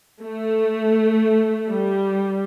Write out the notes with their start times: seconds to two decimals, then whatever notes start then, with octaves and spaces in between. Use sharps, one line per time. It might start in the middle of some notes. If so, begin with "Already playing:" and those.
0.22 A3
1.68 G3